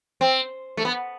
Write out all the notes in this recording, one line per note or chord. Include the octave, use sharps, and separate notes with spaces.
C4
A3
B3